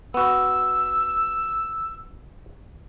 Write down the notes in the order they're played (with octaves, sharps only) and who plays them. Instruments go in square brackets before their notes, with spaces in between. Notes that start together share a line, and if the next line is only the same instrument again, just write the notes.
[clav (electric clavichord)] B3 F#4 [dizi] E6